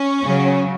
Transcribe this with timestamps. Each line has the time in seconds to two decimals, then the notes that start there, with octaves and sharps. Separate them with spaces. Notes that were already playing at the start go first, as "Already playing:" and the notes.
Already playing: C#4
0.23 C#3 F#3